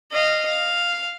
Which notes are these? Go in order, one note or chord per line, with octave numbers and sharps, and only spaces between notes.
D#5 F5
F5